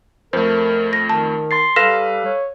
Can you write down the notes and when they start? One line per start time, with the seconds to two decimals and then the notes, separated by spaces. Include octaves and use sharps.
0.33 F2 A3 A#4 C5
0.93 A#6
1.09 D#3 A5
1.51 C6 A6 C7
1.76 G3 A4 B4 F5 F6 A#6 B6 E7
2.25 C#5